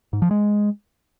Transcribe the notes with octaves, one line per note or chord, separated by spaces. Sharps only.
G#2
F3
G#3